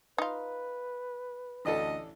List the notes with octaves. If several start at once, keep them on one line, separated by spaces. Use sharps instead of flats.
D#4 F4 B4
A1 D2 D4 A4 D#5